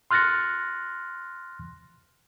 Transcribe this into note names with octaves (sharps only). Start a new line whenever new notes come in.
C6 F6 F#6 A6 A#6 C#7